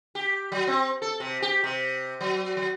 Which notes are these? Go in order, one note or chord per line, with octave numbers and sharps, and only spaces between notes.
G4
F#3
C4
A4
C3
G4
C3
F#3
F#3